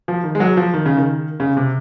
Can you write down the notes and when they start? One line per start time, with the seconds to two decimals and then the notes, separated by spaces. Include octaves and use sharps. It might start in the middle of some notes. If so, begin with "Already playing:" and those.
0.08 F3
0.24 D#3
0.35 G#3
0.40 F#3
0.57 F3
0.74 D#3
0.86 C#3
0.97 D#3
1.40 C#3
1.57 C3